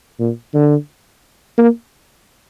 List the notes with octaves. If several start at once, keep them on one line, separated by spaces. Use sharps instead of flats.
A#2
D3
A#3